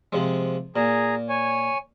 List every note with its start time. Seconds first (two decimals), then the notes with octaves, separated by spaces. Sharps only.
0.13 C3 F3 G#3
0.76 A#2 G#4 A#5
1.29 C#5 G#5